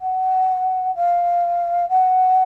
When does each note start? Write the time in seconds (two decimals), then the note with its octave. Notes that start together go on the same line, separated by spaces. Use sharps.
0.01 F#5
0.95 F5
1.89 F#5